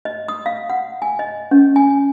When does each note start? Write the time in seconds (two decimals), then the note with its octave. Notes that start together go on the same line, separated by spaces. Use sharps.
0.05 D#5
0.28 D#6
0.46 F5
0.70 F#5
1.02 G#5
1.19 D#5
1.51 C#4
1.76 G#5